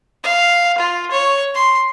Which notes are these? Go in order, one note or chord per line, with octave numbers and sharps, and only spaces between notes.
F5
F4
C#5
C6